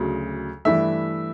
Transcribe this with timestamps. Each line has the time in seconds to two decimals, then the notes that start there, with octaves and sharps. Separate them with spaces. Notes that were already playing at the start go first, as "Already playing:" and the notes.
Already playing: D2 C#3 F#3
0.65 G2 E3 A3 D4 E5